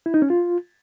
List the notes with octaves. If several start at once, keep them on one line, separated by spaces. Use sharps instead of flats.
E4
D#4
C#4
F4